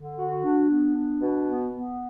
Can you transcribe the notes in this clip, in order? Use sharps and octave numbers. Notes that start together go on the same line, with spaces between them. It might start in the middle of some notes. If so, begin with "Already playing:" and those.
Already playing: D3
F#4
D4
B3
D4
B2
B3
B3